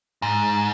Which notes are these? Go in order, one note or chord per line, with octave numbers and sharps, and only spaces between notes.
G#2